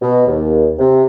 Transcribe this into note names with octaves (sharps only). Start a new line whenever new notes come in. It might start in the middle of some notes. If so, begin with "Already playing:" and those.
B2
D#2
C3